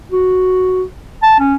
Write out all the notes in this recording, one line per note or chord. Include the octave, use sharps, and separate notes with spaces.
F#4
A5
C#4